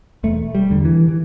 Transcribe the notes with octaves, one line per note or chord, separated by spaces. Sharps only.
E1 A3
G3
E2 D3
E3
E3